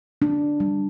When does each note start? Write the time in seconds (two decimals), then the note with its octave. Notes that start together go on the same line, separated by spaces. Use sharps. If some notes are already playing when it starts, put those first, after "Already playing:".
0.22 D4
0.60 G3